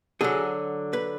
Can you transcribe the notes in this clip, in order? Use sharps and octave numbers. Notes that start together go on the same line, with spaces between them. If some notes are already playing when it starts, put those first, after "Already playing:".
D3 F#3 G#4
B4